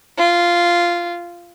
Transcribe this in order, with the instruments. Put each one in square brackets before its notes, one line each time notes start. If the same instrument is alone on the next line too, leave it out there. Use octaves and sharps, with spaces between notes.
[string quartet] F4